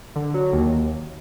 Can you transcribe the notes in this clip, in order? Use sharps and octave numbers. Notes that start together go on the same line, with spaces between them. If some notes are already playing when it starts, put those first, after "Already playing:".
D3
F#3
D#2